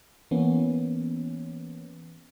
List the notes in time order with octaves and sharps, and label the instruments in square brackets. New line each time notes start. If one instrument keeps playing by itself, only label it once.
[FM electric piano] E3 A#3 B3 C#4